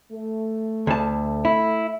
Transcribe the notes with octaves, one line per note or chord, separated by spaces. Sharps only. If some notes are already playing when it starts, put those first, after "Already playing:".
A3
D2 A5
E4